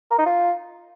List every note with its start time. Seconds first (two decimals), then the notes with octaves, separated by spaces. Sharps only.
0.11 A#4
0.18 D#4
0.26 F4